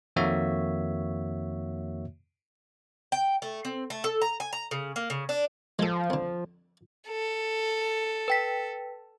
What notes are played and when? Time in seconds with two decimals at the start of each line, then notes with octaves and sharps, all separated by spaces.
0.16 F2 D#3 A#3 F#4 C#5 E5
3.12 G5
3.42 A3
3.65 C4
3.90 A3
4.04 A4
4.21 A#5
4.40 G#5
4.53 A#5
4.71 C#3
4.96 A#3
5.10 C#3
5.29 D4
5.79 F3 G#3 A4
6.10 F2 D3
7.08 A4
8.28 B4 G5 B6